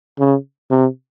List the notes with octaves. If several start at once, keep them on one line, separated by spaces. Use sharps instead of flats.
C#3
C3